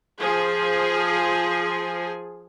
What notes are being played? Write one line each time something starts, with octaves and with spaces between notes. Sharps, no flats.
F3 G#4